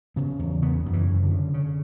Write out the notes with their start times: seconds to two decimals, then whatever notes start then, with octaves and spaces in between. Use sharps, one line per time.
0.16 C#3 B3
0.39 E2
0.62 C#3 B3
0.86 F#2
0.93 E3
1.09 C#3
1.23 D3
1.32 C#3
1.54 C#3